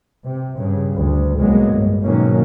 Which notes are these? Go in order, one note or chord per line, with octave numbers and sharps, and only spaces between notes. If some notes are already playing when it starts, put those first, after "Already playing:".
C3
G2 C#3
D2
C2 A2 F#3 G#3 A#3 B3
G1
G#2 B2 D#3 F#3 A#3 C#4